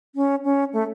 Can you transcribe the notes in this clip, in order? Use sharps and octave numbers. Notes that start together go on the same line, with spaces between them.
C#4
C#4
A3